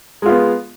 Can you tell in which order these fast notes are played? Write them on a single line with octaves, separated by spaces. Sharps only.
G#3 F4 B3